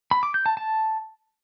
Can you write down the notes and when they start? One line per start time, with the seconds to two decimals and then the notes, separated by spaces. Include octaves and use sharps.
0.11 B5
0.23 D6
0.34 G6
0.46 A5
0.57 A5